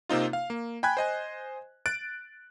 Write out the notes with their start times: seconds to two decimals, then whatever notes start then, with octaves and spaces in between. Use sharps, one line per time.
0.09 C3 A#3 C4 D#4 F4
0.33 F5
0.50 A#3
0.83 G5 G#5 B5 F#6 G#6
0.97 C5 D#5 G#5
1.86 F#6 A6 D7